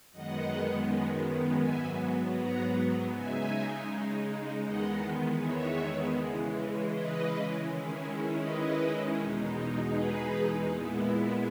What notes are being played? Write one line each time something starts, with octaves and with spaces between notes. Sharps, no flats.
F#2 D#3 G#3 B3 D#5 F#5
G#2 F#3 B3 E5 G#5
F#5 A#5
C#3 G#3 D#4 E5 G#5
E2 D#3 G#3 B3 D#5 F#5
C#5 E5
C#3 E3 G#3
B4 D#5
D#3 G#3 C#4 E4
B4 D#5
E2 B2 G#3 D#4
G#4 B4
A#2 G#3 B3 E4